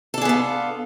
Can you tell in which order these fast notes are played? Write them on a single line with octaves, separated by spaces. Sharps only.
A4 D4 G#4 B3 F4